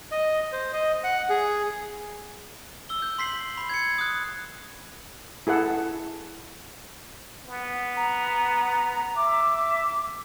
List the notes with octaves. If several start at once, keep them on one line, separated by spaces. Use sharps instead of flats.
D#5
C5
D#5
F#5
G#4
E6 G7
G6
C6 B6 C7 F#7
B5
G#6 C#7
D#6 F#6
E4 G#4 A4 F#5
B3
A#5
E5 D6